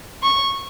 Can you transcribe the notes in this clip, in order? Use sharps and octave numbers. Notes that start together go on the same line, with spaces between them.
C#6